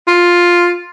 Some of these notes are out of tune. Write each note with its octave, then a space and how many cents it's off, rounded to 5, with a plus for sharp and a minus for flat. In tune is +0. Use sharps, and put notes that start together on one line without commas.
F4 +5